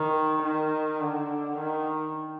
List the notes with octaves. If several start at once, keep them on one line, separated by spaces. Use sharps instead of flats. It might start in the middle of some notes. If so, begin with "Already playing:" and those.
Already playing: D#3
D#3
D3
D#3